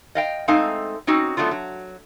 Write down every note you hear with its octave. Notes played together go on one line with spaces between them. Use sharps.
D#5 F5 G5
G#3 A3 C4 D#4 F5 G#5
C4 C#4 D#4 F#4
F#3 A3 B3 D4 F4
F#3